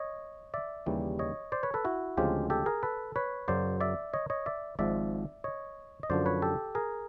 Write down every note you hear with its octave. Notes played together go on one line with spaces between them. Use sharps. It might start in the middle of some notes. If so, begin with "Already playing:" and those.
Already playing: C#5 D#5
D5 E5
D#2 C#3 E3 G3
C#5 D#5
C5 D5
B4 C#5
A4 B4
E4 F#4
D2 C#3 F3 G#3 C4 F4 G4
G4 A4
G#4 A#4
A4 B4
B4 C#5
F#2 C#3 F#3 C5 D5
D5 E5
C#5 D#5
C#5 D#5
D5 E5
G#1 G#2 F3 D5 E5
C#5 D#5
D#5
F#2 D3 F3 C5 D5
B4 C#5
G4 A4
G#4 A#4